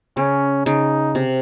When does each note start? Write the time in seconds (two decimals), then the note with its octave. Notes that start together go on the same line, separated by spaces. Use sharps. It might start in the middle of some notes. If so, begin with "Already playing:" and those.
0.17 C#3 C#4
0.66 C#3 D#4
1.15 C3